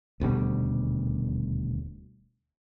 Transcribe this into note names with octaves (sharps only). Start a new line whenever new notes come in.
D#1 D2 B2 G3